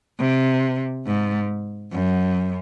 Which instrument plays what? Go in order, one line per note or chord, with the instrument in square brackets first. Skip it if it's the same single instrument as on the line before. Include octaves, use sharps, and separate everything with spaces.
[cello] C3
G#2
F#2